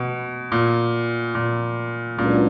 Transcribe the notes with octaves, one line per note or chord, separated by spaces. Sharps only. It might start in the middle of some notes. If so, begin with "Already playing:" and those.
Already playing: B2
A#2
A#2
C#2 A#2 C#3 F#3 B3 D4